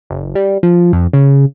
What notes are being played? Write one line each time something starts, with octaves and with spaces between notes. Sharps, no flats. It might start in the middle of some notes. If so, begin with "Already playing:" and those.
F#1
G3
F3
F2
C#3